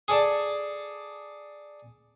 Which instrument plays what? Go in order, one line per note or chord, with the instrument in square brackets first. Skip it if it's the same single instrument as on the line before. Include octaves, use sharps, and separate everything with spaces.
[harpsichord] G#4 A4 D5 A5